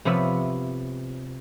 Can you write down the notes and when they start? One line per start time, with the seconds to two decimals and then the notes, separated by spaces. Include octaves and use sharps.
0.05 C3 F3 B3 C#5 E5 B5